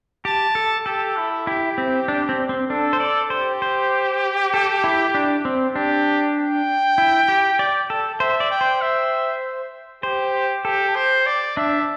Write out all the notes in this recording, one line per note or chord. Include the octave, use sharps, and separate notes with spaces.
G4 A5
A4
G4 A4
E4
E4 G4
C4
D4
C4
C4
D4 A4
C5
D5
G4 C5
C5
A4
E4
D4
C4
D4 G4
G5
E4
G4
D5
A4
C5 E5
D5
G5
C5
E5
G4 C5
G4 A4
C5
D5
D4 E5